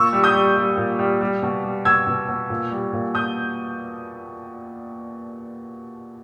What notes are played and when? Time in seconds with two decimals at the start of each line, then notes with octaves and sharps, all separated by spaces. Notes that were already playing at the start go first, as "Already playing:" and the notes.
Already playing: A#2 C#6 E6
0.13 G3
0.24 D#6 G6
0.35 G3
0.56 G3
0.77 A#2
0.99 G3
1.21 G3
1.43 B2
1.63 G3
1.85 B2 E6 G#6
2.07 B2
2.28 B2
2.50 A#2
2.71 G3
2.93 A#2
3.15 A#2 D#6 G6